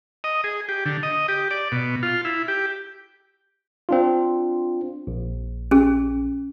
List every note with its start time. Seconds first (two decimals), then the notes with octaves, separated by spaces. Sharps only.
0.24 D#5
0.44 G#4
0.69 G4
0.86 D3
1.03 D#5
1.28 G4
1.51 D5
1.72 B2
2.03 F4
2.25 E4
2.48 G4
3.89 C4 D4 F4
5.07 A#1
5.71 C#4 G#4